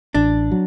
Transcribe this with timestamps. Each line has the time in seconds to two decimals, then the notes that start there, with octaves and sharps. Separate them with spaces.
0.14 A1 D4
0.51 F#3